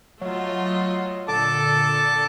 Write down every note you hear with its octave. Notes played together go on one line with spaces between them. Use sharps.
F#3 A3 F4 D#5
A#2 D3 A4 A5 D6